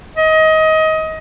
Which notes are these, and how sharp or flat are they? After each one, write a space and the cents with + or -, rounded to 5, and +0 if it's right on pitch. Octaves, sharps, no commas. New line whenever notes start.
D#5 +20